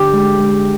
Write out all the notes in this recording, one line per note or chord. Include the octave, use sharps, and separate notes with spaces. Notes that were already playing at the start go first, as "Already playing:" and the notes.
Already playing: D3 G4
G#3
G#3